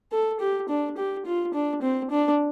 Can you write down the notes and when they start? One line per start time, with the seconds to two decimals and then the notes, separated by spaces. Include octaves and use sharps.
0.12 A4
0.40 G4
0.69 D4
0.97 G4
1.26 F4
1.54 D4
1.82 C4
2.11 D4